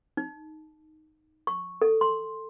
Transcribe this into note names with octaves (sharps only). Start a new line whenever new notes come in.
D#4
C#6
A4
C6